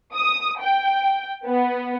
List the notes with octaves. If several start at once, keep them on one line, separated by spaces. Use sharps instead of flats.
D#6
G5
B3